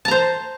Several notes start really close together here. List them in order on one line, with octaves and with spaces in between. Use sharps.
A5 A#5 C5